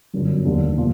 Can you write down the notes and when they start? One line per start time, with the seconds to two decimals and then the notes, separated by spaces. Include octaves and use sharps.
0.13 G1 F#2 D3 F#3
0.45 F1 D#2 D3 G3
0.77 A#2 F3